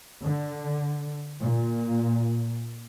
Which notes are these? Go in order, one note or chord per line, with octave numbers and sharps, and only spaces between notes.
D3
A#2